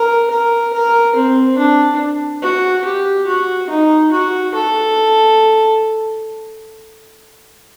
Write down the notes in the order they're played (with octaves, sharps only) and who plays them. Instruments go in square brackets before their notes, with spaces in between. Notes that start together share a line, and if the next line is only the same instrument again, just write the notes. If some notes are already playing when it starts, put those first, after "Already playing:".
Already playing: [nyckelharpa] A#4
A#4
A#4
C4
D4
F#4
G4
F#4
D#4
F#4
A4